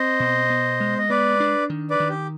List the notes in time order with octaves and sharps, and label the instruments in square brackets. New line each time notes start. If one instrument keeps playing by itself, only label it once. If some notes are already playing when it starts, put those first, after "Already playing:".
Already playing: [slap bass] C4 [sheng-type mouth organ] C5 D#5
[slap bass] B2
B3
G#3
[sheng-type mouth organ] D#5
[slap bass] B3 [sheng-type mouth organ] B4 D5
[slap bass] D4
D#3
[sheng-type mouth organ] B4 D5
[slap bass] D#3
[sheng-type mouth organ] G4